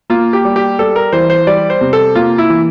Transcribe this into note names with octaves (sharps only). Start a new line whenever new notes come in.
A#3 F4
G4
G3
G4
G3 A4
A#4
E3 C5
C5
G3 D5
C5
C3
A4
A#3 F4
E4
E3